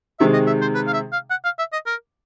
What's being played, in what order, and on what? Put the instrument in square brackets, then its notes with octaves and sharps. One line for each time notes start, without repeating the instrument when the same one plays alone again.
[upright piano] C3 D#3 G#3 [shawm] E5
[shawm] D#5
E5
C5
B4
F5
E5
F5
F#5
F5
E5
D#5
A#4